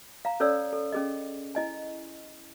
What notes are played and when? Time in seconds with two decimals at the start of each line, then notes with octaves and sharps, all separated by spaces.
0.25 F5 A#5
0.40 C#4 A4 C#5 D5 E6
0.73 A4
0.92 C#4 G#4 D#5
1.55 E4 D#5 G#5